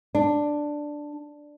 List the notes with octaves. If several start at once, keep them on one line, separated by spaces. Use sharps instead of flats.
D4